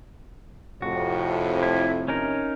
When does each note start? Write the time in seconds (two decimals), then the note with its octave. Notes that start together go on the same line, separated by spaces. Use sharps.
0.82 F2 A2 C3 F#4
1.63 E4
2.08 C#4 D#4 A#4